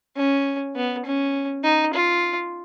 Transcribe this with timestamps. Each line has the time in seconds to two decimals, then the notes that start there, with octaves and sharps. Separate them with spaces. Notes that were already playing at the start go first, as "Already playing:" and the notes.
0.16 C#4
0.76 B3
1.05 C#4
1.64 D#4
1.94 F4